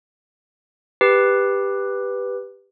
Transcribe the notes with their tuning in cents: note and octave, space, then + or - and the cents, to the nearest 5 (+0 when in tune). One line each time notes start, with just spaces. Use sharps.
G4 +10 B4 +0